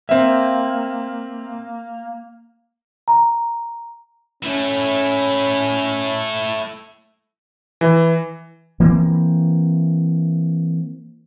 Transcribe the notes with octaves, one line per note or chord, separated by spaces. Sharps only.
A#3 C4 E5
A#5
A3 C#4 E4
E3
E3 A#3 C4